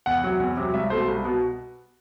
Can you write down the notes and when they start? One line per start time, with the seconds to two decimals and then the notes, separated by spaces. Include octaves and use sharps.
0.06 E2 F#5
0.24 C3 F#3
0.40 E2
0.57 C3 F#3
0.74 C2 E5
0.90 B2 A3 C5
1.08 C2
1.24 B2